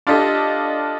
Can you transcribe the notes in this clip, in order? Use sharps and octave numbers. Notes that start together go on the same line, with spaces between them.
D4 F4 G4 A4 D#5